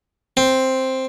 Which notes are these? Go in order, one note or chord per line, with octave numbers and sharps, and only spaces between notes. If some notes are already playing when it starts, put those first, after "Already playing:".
C4